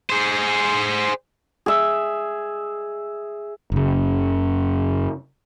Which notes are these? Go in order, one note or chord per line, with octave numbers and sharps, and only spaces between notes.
G#4 C5
G#4 E5
F#1 C#3